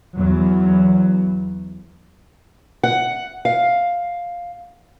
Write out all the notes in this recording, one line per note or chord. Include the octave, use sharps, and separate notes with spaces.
E2 F#3
F#5
F5